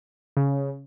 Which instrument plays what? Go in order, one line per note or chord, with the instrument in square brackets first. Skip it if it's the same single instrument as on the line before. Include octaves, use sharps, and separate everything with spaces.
[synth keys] C#3